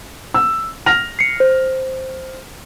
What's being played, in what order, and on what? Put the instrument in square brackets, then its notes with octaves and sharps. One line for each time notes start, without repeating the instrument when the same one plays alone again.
[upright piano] E6
F6 A#6 F7
[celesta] C7 C#7
C5